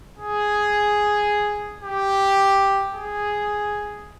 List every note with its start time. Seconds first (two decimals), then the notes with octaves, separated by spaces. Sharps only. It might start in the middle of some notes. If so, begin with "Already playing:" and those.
0.18 G#4
1.83 G4
2.93 G#4